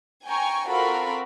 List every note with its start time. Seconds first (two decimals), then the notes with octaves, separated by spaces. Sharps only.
0.25 G5 G#5 A#5 C#6
0.67 C4 F4 F#4 A4 A#4 B5